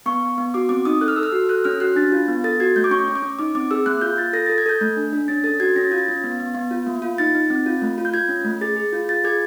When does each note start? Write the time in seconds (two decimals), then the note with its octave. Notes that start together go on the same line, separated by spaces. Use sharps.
0.06 B3 C#6
0.22 B3
0.38 B3
0.54 F#4 D6
0.69 C4 D6
0.85 D#4 D#6
1.01 A4 F#6
1.08 F6
1.16 A4 E6
1.23 F6
1.32 F#4
1.49 A4 F#6
1.64 C#4 F6
1.80 F#4 F#6
1.96 D4 A6
2.12 F4
2.28 B3
2.44 A4 A6
2.60 F#4 G#6
2.76 A3 G6
2.84 D6
2.91 C#4 C#6
3.08 C#4
3.15 D6
3.23 C#4
3.39 D#4 D6
3.55 C4 D6
3.71 G#4 E6
3.86 A#3 F#6
4.01 F4 G6
4.17 F4 A6
4.33 A4 A#6
4.46 A6
4.49 A4
4.58 G#6
4.66 A4 G6
4.81 A3
4.97 D4
5.13 D4
5.28 C#4 A6
5.44 A4 A6
5.60 F#4 G#6
5.76 C#4 A#6
5.84 A6
5.91 F4 G#6
5.98 A6
6.08 C#4
6.24 B3
6.40 B3
6.55 B3
6.71 F4
6.87 A#3
7.02 F4
7.18 D#4 A6
7.35 D#4
7.50 C4
7.66 F4
7.82 A3
7.98 F4
8.05 G6
8.14 F4 G#6
8.29 C#4
8.45 A3
8.61 G#4 A6
8.76 G#4
8.93 F4
9.09 F4 A6
9.24 G#4 G#6